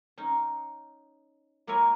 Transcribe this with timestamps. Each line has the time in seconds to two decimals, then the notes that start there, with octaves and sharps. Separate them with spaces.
0.18 C#4 D#4
1.67 A#3 E4 A#4 C#5 G#5